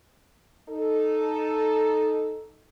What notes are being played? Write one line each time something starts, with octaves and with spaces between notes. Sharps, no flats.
D#4 A4